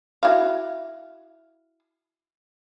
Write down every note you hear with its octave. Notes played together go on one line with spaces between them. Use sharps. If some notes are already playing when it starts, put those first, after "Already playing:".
E4 F#4 F5